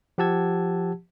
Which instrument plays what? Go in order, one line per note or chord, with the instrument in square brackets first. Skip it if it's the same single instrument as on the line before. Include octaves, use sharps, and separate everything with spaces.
[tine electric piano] F3 G4 F#5 A5 E6 G#6